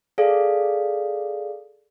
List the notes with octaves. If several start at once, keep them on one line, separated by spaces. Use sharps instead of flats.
G#4 A4 D5 F5